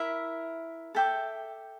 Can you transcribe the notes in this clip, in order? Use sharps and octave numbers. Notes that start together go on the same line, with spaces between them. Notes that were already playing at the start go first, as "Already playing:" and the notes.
Already playing: E4 A#4 E5
A4 E5 G5 D6